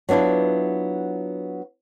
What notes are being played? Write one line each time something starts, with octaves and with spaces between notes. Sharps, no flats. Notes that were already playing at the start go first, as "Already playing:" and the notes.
F#3 B3 D4 E4 F4